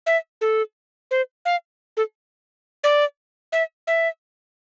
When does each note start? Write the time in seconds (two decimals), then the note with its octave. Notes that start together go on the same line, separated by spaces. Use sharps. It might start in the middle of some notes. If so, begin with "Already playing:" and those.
0.06 E5
0.41 A4
1.11 C5
1.45 F5
1.97 A4
2.84 D5
3.52 E5
3.87 E5